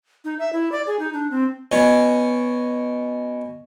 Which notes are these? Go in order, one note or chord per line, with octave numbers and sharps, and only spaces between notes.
D#4
E5
E4
D5
G#4
D#4
D4
C4
B2 C#4